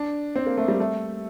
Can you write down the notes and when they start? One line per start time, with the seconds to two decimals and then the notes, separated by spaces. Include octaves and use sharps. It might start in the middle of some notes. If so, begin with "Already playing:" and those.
Already playing: D4
0.36 C4
0.46 A#3
0.57 A3
0.68 G3
0.80 A3